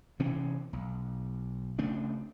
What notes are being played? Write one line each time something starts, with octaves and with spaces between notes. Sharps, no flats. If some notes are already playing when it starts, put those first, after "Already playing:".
C3 E3 C4 C#4
B1
C#3 A3 C4 D4